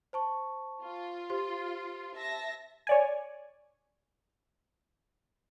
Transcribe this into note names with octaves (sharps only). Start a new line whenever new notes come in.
C5 A5 C#6
F4
G4 C5 C6
E5 A5 A#6
C#5 D5 G#5